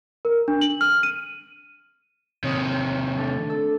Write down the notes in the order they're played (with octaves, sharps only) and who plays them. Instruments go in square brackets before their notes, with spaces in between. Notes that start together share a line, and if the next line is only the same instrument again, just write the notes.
[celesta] A#4
D4
F#7
F6
D#7
[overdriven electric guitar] C3 D#3 [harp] C#5 D#5 B5
[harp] A3 D4
A4